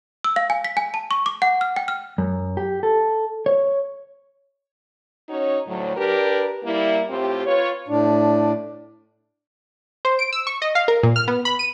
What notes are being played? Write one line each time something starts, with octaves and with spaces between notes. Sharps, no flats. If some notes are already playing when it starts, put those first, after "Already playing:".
E6
F5
G#5
B6
G#5
A5
C#6
D6
F#5
F6
G5
F6
F#2
G4
A4
C#5
C#4 D#4 F#4 C#5
D2 A2 F#3
D4 G4 A#4 B4
G3 A#3 E4
A2 C4 F4 G4
F4 B4 C#5
A2 D4
C5
D7
E6
C#6
D#5
F5
A#4
A#2
F6
B3
B5
D#7